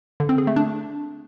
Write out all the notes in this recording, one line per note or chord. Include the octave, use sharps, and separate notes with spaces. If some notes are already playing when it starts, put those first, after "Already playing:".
D3
C4
G#4
A3
D4